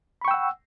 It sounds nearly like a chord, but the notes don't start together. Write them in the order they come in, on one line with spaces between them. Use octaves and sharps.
B5 C#6 G5 E6 F#5